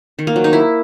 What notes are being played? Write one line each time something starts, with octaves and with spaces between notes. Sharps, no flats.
D#3
A#3
F#3
D#4
E4